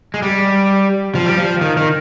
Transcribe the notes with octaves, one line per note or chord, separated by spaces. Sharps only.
G#3
G3
F3
G3
F3
D#3
D#3